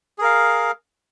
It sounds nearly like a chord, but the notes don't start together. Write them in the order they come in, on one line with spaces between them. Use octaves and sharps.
G#4 A#4 F5